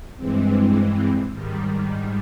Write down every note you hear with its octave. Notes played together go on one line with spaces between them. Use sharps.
G2 E3 G#3 C4
G#2 D#3 G3